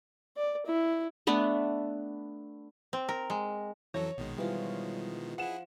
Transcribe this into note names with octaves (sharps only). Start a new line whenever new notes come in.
D5
E4
A3 B3 D4
C4
A#4
G#3
F2 E3 F#3 A4 C#5 A#5
A#1 B2 D#3 G#3
E3 F3 G3 F4
F3 E4 G#4 F#5 E7